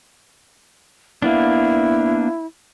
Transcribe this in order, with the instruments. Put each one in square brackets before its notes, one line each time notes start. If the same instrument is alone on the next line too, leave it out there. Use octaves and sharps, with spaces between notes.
[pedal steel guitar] A#3 B3 D4 [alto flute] E4